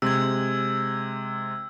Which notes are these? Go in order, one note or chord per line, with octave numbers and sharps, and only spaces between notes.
C3 G#3 E6 G#6